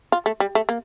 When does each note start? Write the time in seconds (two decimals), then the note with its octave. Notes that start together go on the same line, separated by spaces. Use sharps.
0.12 F4
0.26 A3
0.40 G3
0.55 A3
0.69 A#3